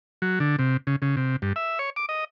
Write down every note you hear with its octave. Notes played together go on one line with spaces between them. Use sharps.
F#3
D3
C3
C#3
C#3
C3
G2
E5
C#5
D6
D#5